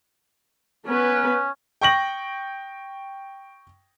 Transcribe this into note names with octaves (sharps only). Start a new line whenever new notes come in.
B3 C#4 B4
G5 C#6 A#6 F#7